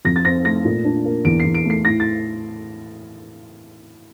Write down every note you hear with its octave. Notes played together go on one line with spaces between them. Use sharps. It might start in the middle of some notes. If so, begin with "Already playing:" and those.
F2 A#6
A6
C4 A#6
A3 A#6
A#2
D4
A#3
E2 D7
C7
E2
D7
A3 C7
A2 A#6
A6